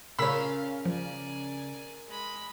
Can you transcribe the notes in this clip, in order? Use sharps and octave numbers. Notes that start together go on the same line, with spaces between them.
C#3 C#4 F4 A#4 F5 B5 E6 B6
F3 D5 G#5
G#3 B5